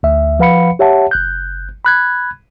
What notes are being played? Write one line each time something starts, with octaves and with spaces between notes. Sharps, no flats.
D2 E5
F3 B4 F5 F#5 B5 C#7
G4 C#5 E5 F#5 A5
G1 F#6 G6
B5 F#6 G#6